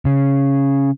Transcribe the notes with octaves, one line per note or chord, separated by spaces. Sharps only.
C#3